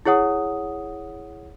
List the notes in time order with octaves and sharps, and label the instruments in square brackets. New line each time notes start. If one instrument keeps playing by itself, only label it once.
[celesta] E4 G#4 C#5 F#5 D#6